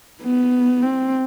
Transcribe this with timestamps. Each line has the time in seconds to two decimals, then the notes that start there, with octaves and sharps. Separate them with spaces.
0.22 B3
0.82 C4